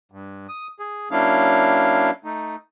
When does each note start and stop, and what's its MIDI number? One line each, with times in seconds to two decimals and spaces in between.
0.12 0.47 43
0.49 0.68 87
0.80 1.09 68
1.11 2.10 54
1.11 2.10 58
1.11 2.10 61
1.11 2.10 62
1.11 2.10 64
1.11 2.10 77
2.24 2.56 57
2.24 2.56 63